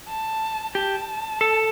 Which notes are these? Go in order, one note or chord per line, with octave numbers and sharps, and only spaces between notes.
A5
G4 A5
A4